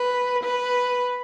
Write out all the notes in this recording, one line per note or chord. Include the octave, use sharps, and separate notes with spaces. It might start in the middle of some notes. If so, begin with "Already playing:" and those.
Already playing: B4
B4